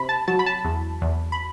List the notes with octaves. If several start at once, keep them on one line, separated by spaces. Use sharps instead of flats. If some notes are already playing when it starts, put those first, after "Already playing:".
Already playing: C3 B5
A5
F#3 A5
B5
A5
E2
E2
B5